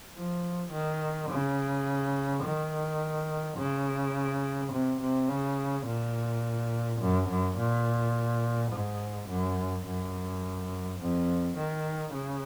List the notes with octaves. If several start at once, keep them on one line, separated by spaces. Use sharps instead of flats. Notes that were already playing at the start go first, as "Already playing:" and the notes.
F3
D#3
C#3
D#3
C#3
C3
C3
C#3
A#2
F#2
F#2
A#2
G#2
F#2
F#2
F2
D#3
C#3